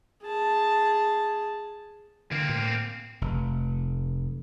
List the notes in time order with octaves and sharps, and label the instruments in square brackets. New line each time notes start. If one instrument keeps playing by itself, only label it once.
[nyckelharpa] G#4 A5
[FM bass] D3 [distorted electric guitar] A#3 C4
[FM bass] A2
[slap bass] F1